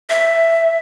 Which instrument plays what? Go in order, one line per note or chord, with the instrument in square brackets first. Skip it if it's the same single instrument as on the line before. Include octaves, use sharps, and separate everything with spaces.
[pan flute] E5